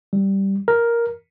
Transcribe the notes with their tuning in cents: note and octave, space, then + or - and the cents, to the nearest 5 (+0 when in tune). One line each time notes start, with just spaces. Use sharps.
G3 -5
A#4 +5